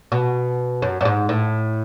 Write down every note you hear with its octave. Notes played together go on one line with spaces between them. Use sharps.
B2
F#2
F#2
G#2
A2